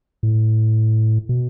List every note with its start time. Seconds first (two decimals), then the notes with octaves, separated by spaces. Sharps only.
0.23 A2
1.29 B2